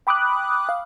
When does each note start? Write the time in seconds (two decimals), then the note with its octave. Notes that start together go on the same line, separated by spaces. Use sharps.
0.07 G5 B5 D6 D#6 F#6
0.69 F5